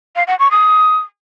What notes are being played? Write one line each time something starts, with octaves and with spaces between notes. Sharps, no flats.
F5
F#5
C#6
D#6